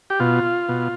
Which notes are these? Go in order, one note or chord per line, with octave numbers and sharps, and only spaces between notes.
G4
B2 F4
B2